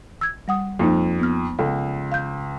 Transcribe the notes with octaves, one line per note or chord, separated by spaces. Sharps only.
E6 G#6
G3 F#5 D#6
F2 F3 A#3 D#4
B3 F6
C#2 A4
F5 G6